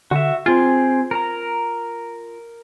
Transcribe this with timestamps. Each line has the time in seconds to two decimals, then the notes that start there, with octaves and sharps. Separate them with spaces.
0.11 D3 F#4 E5
0.46 C4 F4 G#4
1.11 A#4 A#5